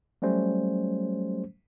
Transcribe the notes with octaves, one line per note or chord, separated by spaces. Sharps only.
F#3 G3 A3 C#4 C5